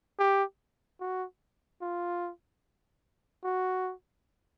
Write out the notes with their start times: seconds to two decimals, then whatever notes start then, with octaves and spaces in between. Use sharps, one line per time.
0.19 G4
1.00 F#4
1.82 F4
3.44 F#4